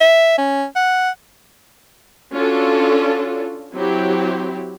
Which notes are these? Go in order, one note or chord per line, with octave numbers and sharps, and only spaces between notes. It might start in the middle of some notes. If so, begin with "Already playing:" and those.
E5
C#4
F#5
C#4 D4 F4 F#4 A4
F#3 C4 E4 G4